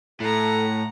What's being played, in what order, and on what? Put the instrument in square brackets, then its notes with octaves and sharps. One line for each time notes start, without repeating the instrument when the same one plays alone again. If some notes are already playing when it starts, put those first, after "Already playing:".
[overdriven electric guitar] A2 [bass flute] A4 [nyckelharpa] F#5 A#5